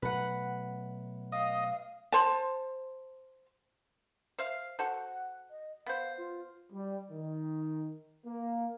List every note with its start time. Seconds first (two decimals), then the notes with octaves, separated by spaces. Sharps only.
0.02 B2 F#3 A3 B4 F#5
1.32 D#5 F5
2.12 C5 A5
4.39 C5 E5 F5
4.79 F#4 A4 C5 F#5
5.50 D#5
5.87 B3 C5 F5
6.18 F4
6.72 G3
7.11 D#3
8.26 A#3